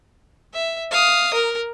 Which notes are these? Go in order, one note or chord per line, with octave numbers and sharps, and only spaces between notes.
E5
F5 D#6
A#4